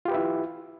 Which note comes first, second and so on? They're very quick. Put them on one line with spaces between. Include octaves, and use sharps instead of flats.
F4 G4 B4 E5 E4